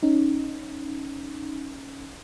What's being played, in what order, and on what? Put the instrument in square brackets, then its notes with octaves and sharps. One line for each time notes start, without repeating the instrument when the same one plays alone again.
[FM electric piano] C#4 D#4